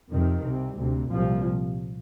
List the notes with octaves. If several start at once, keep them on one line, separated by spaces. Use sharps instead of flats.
F2 C3 D#3
C2 C3
D2 C3
C2 A#2 F3